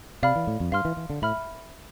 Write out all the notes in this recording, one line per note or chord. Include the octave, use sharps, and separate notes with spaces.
C3 D5 F5 B5 F6
E3
A2
F2
G2 F5 C6 F6
E3
E3
D3
A2 E5 B5 F6